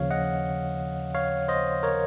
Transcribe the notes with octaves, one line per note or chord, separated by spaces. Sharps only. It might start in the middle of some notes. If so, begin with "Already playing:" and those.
Already playing: D#2 C#3 F3 C#5 F5
D#5 F#5
C#5 F5
C5 D#5
A#4 C#5